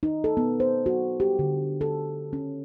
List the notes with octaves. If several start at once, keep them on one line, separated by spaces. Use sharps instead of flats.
D#4
A4
B3
C5
F#4
G4
D3
A4
C#4